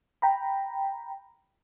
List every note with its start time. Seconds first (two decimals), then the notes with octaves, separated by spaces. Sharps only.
0.22 G5 A#5 B5